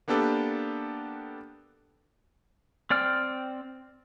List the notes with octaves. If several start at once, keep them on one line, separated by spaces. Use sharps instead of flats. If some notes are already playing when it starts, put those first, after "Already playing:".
A#3 B3 D4 G4 A4 B4
C4 D5 G5 F6